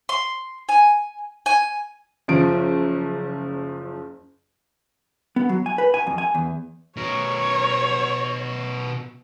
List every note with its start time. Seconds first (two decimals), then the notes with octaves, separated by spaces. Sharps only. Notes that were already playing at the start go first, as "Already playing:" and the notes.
0.09 C6
0.69 G#5
1.46 G#5
2.28 F#1 F3 D7
5.36 B3
5.49 F#3
5.66 G#5
5.78 B4
5.94 G#5
6.07 F2
6.18 G#5
6.34 E2
6.97 B2 A#4 C#5